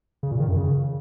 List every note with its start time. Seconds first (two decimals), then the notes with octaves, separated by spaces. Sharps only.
0.23 C#3
0.31 A#2
0.40 D#3
0.48 F#2
0.57 C#3